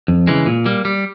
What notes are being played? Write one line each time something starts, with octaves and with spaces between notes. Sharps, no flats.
F2
C#3 E3 G#3
A#2
G3 A#3
G3